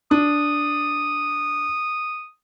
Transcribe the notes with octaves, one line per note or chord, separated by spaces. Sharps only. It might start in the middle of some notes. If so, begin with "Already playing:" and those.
D4 D#6